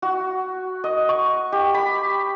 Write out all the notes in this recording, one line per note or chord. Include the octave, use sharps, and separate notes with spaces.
F#4
D#5
C#6
G4
B5